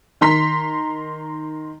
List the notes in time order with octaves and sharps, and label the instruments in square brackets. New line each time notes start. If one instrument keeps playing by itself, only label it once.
[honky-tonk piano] D#3 A#5 C6 B6